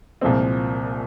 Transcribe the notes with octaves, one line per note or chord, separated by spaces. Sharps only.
C2 A#2 F3 G#3 C4